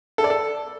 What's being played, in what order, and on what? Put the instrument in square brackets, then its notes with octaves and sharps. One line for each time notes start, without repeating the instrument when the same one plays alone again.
[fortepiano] A4
D5
A4